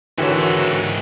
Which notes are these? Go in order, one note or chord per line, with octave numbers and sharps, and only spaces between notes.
G#2 D3 E3 F#4 G4 A#4 C#5 E5